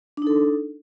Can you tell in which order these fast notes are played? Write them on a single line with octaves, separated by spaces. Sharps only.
D4 D#4 A4